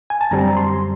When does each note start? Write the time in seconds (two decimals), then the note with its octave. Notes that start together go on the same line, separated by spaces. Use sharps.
0.10 G#5
0.21 A5
0.31 F#2 D3 G3 C4 A#5
0.57 C6